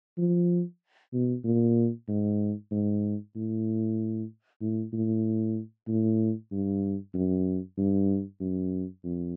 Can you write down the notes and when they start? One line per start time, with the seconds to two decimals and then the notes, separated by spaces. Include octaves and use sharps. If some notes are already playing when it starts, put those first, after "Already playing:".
0.18 F3
1.13 B2
1.44 A#2
2.08 G#2
2.71 G#2
3.35 A2
4.61 A2
4.93 A2
5.88 A2
6.51 G2
7.14 F#2
7.78 G2
8.40 F#2
9.04 F2